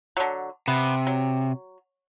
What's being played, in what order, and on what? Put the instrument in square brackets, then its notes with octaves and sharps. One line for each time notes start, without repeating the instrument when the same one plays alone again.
[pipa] D3 F#3
[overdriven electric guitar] C3 [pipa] B3
[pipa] F#3